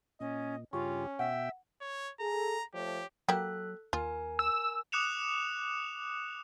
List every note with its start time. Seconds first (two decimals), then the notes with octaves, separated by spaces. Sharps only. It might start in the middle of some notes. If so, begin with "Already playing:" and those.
0.20 A#2 C#4 D#5
0.73 G2 C#3 C#4 F4 G4 C#6
1.19 B2 E5 F#5 G5
1.81 C#5
2.20 G#4 A4 A#5
2.74 F3 A3 G4 C#5
3.29 F#3 A#3 F#4 G4 A4 F#6
3.93 D#2 F4 A#4 G#5
4.39 E6
4.92 D6 D#6 F#6 C#7 E7 F7